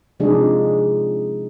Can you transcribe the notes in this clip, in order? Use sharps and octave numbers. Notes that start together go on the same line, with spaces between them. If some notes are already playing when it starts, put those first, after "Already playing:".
C3 F3 G#3 D4 D#4 G#4